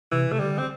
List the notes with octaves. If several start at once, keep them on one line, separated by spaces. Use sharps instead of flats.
C3 E3
C3 A3
D3 G3
C4